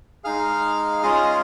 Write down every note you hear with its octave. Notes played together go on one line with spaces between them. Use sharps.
G#3 D#4 G#4 F5 F6
G#3 C#4 F4 G#4 D#5 D#6